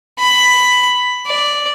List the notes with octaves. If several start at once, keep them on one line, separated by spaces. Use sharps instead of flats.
B5
D5